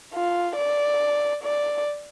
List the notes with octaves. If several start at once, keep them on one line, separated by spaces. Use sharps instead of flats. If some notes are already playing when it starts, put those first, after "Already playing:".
F4
D5
D5